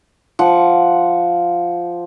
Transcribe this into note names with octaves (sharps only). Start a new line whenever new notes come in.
F3 F#5